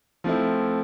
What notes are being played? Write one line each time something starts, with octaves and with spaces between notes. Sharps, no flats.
F3 A3 C4 E4